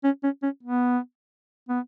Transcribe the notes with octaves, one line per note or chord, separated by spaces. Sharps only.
C#4
C#4
C#4
B3
B3